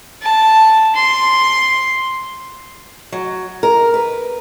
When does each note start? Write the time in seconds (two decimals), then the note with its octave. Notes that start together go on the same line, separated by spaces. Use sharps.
0.22 A5
0.95 C6
3.12 F#3
3.63 A#4
3.94 B4